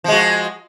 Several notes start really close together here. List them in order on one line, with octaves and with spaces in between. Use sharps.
F3 G#3 F#4